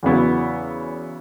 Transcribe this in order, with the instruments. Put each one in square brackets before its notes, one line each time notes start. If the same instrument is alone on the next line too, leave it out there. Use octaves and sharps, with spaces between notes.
[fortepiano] E2 C#3 F#3 B3 E4